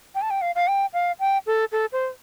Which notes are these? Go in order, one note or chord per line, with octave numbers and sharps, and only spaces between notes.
G5
A5
G5
F5
F5
G5
F5
G5
A4
A4
C5